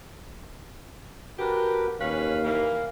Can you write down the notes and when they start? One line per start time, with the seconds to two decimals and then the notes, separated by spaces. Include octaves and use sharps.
1.39 D4 F#4 G4 A#4 B4
2.00 D#2 C#4 B4 C#5 F5
2.44 E3 A#3